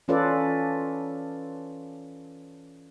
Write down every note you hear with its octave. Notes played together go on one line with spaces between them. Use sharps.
E3 C#4 F4 A4 B4 D5